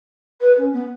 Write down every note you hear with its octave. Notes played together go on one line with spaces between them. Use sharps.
B4
C#4
B3